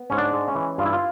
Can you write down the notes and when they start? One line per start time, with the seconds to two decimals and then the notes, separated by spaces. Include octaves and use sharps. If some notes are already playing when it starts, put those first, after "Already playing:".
Already playing: B3
0.10 G#2 C#4
0.18 D4
0.33 G#3
0.48 C#4
0.55 E3
0.78 G2 F4
0.86 E4
0.93 F4